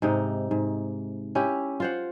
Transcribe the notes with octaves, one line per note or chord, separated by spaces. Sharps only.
G#2 C3 D#4
G#2
C#4 E4 G4
F4 C5 F#5